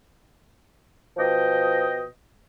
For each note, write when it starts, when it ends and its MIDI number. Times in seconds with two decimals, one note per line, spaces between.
1.17 2.02 47
1.17 2.02 53
1.17 2.02 75
1.17 2.02 79